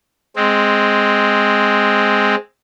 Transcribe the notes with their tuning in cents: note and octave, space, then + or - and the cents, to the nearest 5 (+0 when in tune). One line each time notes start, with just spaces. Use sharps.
G#3 +0 C4 +0